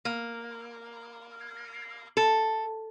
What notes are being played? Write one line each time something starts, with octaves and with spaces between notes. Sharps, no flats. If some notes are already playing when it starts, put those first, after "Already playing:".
A#3
A4